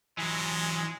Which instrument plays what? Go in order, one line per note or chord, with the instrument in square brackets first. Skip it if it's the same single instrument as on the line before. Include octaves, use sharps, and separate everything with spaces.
[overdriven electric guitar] E3 F#3 [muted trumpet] G#3